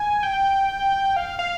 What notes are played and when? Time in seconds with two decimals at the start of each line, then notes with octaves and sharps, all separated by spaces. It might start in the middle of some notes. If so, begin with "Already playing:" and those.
Already playing: G#5
0.23 G5
1.16 F5
1.39 F5